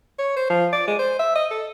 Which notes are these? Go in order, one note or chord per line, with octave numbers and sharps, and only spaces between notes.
C#5
C5
F3
D5
G#3
C5
E5
D#5
A4